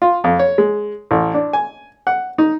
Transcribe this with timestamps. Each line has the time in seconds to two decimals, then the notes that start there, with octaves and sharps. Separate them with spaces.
0.02 F4
0.24 F2
0.39 C#5
0.58 G#3
1.11 A1
1.34 D4
1.53 G#5
2.07 F#5
2.38 D#4